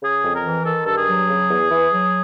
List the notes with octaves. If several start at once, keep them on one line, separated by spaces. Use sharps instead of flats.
C#3 G#4
F2
A#4
E3
D#3 A4
G2 A4
G#4
F#3
C#3
E2
E3
F#3